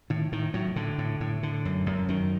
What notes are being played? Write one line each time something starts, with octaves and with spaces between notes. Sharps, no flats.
A2 D#3
A2 D#3
A2 F#3
A2 D3
A2
A2
D3
F#2
F#2
F#2 D#3